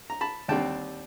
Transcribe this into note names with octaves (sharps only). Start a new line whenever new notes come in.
A#5
A5 B5
D#2 D3 G3 C4 G5 A5